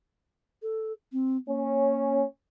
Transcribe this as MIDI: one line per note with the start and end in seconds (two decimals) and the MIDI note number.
0.62 0.92 69
1.12 1.36 60
1.46 2.22 58
1.46 2.23 61